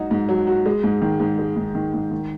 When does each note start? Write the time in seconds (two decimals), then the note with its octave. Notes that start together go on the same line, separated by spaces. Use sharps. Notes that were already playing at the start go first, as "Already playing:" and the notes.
Already playing: G#2 F#3 D#4 F#4
0.11 G#2
0.29 F#3
0.47 F#4
0.66 G#3
0.83 G#2
1.02 D#3
1.20 G#2
1.38 G#3
1.56 G#2
1.75 D#3
1.94 G#2
2.11 D#3